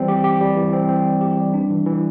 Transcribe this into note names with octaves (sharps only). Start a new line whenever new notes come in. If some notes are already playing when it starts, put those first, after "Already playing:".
Already playing: E3 G3 C4
G4
G4
G3
E3
C4
C4
G3
G4
G3
D4
E3
E3